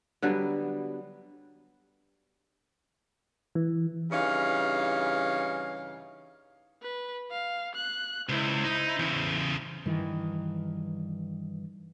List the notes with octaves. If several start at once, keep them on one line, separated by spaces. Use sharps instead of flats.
D3 F#3 G3 B3
E3
G2 C#3 E3 C#4 D#4 F5
B4
F5
F#6
C#2 E4 C5
D#4
E2 C#3
G2 D#3 E3